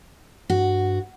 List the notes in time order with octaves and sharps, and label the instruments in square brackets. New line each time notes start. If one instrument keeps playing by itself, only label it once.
[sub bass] G2 [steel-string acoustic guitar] F#4